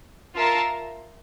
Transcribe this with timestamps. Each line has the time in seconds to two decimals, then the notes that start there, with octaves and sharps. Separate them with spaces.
0.36 F4 A#4 E5 A5